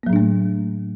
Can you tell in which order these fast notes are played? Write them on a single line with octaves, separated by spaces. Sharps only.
A#3 F#3 A2 D4 A3